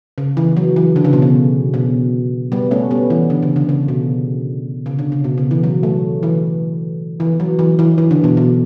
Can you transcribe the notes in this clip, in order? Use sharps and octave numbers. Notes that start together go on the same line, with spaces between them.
C#3
E3
F#3
E3
D3
C#3
B2
C#3
B2
G3 B3
A3 C#4
G3 B3
E3
D3
C#3
D3
C#3
B2
C#3
D3
C#3
B2
C#3
E3
F#3
A3
E3
E3
F#3
E3
E3
E3
D3
B2
B2